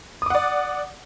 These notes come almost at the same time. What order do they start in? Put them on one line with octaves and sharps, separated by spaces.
D#6 D6 F#5 D5